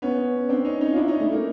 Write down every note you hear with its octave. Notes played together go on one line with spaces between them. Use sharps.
B3 C#4
C4 D4
C#4 D#4
C#4 D#4
F4
D4 E4
C#4 D#4
A3
A#3